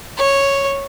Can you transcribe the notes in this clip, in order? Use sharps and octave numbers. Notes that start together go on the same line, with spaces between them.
C#5